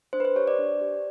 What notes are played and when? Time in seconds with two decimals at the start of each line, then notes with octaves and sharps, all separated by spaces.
0.13 D4 C5
0.20 B4
0.25 C5
0.36 G4 C#5
0.47 D5
0.59 D4
0.81 G4